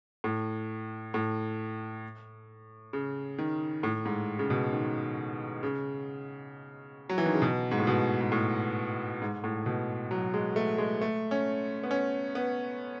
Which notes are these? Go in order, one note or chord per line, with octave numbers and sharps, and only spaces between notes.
A2
A2
C#3
D#3
A2
G#2
C#3
B2
D#3
C#3
F#3
E3
D#3
C#3
B2
G#2
A2
B2
G#2
A2
G#2
A2
B2
F#3
G#3
A3
G#3
A3
C#4
B3
C#4
B3